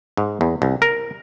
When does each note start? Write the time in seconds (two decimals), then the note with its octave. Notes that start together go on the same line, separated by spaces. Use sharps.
0.17 G#2
0.41 E2
0.62 C2
0.82 A#4